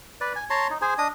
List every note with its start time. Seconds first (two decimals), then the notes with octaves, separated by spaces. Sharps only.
0.21 B4 D5
0.36 G#5
0.50 C#5 A5 A#5 C6
0.70 D#4
0.82 G#4 C5 G#5
0.98 D4 D#5 D#6